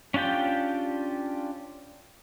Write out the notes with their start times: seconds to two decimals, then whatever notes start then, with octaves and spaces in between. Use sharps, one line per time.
0.14 C#4 D4 F4 G4 G5